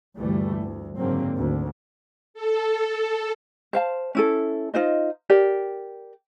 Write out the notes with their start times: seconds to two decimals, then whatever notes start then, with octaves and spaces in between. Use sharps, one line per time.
0.17 G1 D2 E3 G3 A3
0.61 D2
0.99 F#1 G#2 D3 F#3 A#3 C4
1.36 G#1 D2
2.34 A4
3.73 C5 F5 A5
4.15 C#4 E4 A4
4.74 D#4 F4 C5 D#5
5.30 G4 A#4 D5